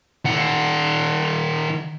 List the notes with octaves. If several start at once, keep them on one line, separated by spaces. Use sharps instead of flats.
D#3 F#5